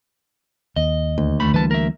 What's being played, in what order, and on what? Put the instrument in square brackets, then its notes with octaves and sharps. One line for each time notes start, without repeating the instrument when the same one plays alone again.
[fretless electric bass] D#2 [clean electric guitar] D#5
[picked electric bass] D2
[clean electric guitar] D#3 A3 B5
[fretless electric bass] E3 G3 A#3 [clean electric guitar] B4 A5
[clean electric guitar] A#4 E5